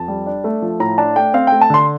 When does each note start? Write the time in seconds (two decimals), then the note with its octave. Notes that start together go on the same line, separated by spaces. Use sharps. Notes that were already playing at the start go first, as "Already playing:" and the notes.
Already playing: F2 A5
0.08 G3
0.27 D4
0.44 A3
0.62 F3
0.80 A2 A#5
0.98 D4 A5
1.16 A3 G5
1.34 C4 F5
1.47 A3 G5
1.61 A5
1.70 D3 C6